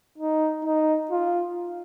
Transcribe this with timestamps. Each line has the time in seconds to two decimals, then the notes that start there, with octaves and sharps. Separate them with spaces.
0.18 D#4
0.65 D#4
1.11 F4